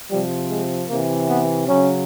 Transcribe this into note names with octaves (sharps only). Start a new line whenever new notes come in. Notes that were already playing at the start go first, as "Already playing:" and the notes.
C3 F3 G3
G#3
C3 E3 A#3
B3
C#3 F#3 C#4